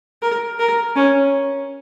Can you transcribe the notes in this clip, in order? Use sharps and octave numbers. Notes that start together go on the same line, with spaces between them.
A#4
A#4
C#4